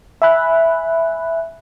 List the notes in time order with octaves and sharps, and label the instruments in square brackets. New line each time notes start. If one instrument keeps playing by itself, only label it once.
[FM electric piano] E5 G#5 B5 F#6